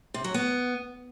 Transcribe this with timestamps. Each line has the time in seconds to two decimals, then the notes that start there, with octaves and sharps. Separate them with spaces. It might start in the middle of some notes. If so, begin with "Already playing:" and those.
0.14 C3
0.24 F#3
0.34 B3